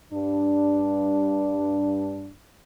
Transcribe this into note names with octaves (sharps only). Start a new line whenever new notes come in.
G2 D4